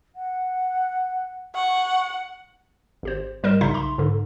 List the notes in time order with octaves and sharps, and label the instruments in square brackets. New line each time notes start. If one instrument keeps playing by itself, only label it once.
[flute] F#5
[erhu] F#5 [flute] C#6
[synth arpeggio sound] G#1 G4 C5
G#2 G3 A#4 D#5 E7
A#1 C#3 D#4 E5 C6
B1 A#5 C6
G#2 D3